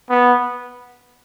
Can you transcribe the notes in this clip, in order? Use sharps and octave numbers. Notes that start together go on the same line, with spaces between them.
B3